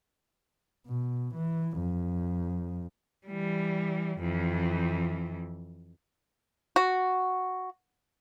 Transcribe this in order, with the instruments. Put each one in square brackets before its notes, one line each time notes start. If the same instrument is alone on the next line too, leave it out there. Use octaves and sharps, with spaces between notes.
[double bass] B2
E3
F2
[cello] E3 G3
F2 E3
[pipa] F#4